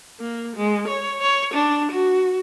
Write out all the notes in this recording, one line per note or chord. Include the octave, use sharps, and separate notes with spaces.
A#3
G#3
C#5
C#5
D4
F#4